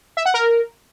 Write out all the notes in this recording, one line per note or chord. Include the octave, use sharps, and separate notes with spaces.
E5
F#5
A#4